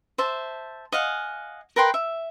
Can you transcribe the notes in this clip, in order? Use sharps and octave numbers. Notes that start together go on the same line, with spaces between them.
C5 E5 A5
D#5 F5 F#5 G#5
A#4 B4 G5 C6
E5